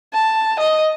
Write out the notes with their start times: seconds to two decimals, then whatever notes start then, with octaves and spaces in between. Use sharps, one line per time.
0.14 A5
0.60 D#5